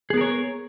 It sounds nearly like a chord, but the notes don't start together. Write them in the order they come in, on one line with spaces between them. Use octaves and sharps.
G#4 B3 A#4 C#5